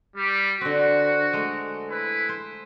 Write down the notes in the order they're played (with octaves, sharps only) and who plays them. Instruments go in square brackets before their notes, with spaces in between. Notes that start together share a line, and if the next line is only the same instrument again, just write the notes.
[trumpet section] G3
[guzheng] D3 C4 [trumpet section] F#4
[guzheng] G#3 A3
[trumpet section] E4 B4
[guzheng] C5